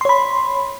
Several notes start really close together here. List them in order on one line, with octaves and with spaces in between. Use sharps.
C6 C#5 B5